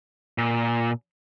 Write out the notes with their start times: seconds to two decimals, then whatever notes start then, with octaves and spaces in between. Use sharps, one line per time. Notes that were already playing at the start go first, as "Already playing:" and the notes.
0.38 A#2